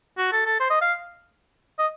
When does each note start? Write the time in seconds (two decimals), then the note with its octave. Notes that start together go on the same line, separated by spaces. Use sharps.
0.18 F#4
0.32 A4
0.46 A4
0.60 C5
0.70 D#5
0.81 F5
1.79 D#5